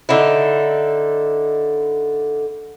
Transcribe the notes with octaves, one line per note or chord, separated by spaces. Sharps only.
D3 D#4 E4